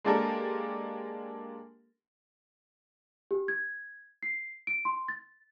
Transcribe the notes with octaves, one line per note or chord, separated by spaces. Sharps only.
G#3 A#3 D4 G4 A4 A#4
G4
G#6
C7
D7
C6
A6